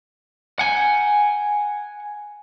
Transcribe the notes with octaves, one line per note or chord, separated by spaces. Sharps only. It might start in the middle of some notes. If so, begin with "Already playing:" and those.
F#5 G#5